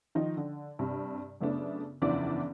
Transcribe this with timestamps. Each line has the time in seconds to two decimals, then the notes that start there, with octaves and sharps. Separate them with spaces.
0.15 D#3 F3 D#4
0.37 D3
0.79 G2 C3
1.41 F#2 C#3 A3 B3 D4
2.02 F#1 E2 E3 F3 D4 D5